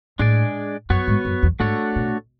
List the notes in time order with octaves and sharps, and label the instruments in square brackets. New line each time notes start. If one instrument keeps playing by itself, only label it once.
[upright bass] A2 [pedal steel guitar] G#3 D4 G#4 D5
[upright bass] F#2 [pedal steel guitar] B3 F#4 C#5
[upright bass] G#2
F#2
E2
[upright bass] G#2 [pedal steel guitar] A3 D4 F#4 A4 C#5
[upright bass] B2